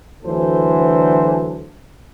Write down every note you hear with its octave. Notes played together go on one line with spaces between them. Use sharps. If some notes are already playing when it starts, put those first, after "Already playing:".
D2 D3 E3 F#3 A4 C5